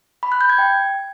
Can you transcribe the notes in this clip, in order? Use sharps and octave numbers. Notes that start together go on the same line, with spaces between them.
B5
F#6
G6
G#6
G5